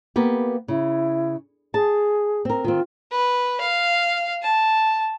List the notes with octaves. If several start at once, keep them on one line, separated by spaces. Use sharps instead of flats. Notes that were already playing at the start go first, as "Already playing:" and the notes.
A#3 B3 G4
C#3 E4
G#4 A5
C4 A#4
D#3 C4 F4
B4
F5
A5